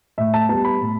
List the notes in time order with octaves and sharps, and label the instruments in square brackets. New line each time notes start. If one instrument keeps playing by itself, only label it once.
[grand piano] A2 E5
A5
G3 B3 A5
B5
A2